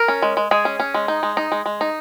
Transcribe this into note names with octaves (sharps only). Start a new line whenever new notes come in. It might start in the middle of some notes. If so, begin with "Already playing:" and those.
Already playing: A#4
C#4
G#3
G#3
G#3 G#4
C#4
C#4
G#3
D#4
G#3
D#4
G#3
G#3
D#4